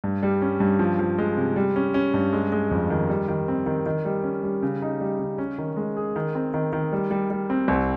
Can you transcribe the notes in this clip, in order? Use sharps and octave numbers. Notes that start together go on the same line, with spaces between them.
G2
G3
C#4
G2
F3
F3
G#3
C3
G3
C#4
C#4
G2
G#3
G#3
F2
D#3
G3
D#3
C4
D#3
D#3
G3
C#4
G3
C#3
D#4
G3
C#3
C#4
D#3
G#3
G#4
D#3
C4
D#3
D#3
G3
G3
G3
C4
C2